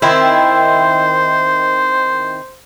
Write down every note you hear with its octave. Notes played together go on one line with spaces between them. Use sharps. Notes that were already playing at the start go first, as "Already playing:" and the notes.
D#3 C4 E4 C5